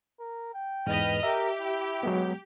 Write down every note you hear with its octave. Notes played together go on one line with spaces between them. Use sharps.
A#4
G5
E2 G#2 B4 D#5 F6
G4 A#4 E5
E4
F#3 G#3 B3